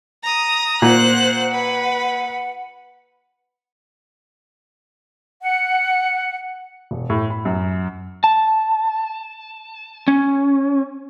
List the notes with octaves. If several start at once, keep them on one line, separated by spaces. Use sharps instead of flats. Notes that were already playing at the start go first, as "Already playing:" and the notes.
A#5 D#6
A#2 C5 F#5 F#6
B4
F#5
E1
A2
B5
F#2
A5
C#4